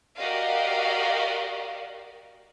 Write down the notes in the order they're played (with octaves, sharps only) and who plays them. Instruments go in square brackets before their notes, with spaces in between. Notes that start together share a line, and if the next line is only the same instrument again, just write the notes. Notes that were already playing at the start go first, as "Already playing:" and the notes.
[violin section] F#4 G4 A#4 D5 D#5 F5